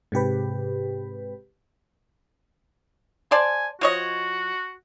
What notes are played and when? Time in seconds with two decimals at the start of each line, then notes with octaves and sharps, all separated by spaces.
0.12 G#2 C3 G4 B4
3.31 C5 D5 G#5 A5
3.81 F3 F#4 C#5 D#5